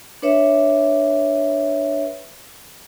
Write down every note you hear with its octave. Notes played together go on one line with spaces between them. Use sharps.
D4 B4 C#5 E5